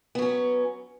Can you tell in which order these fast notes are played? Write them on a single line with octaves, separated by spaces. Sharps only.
B3 F#3 C#4